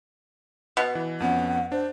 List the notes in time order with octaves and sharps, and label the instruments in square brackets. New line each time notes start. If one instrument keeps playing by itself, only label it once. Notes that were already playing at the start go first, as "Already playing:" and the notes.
[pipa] B2
[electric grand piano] E3
[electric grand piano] F2 B3 C#4 [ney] F#5
[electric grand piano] D4 [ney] C5